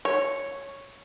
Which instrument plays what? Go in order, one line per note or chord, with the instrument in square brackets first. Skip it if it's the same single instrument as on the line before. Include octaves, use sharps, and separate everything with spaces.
[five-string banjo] C#5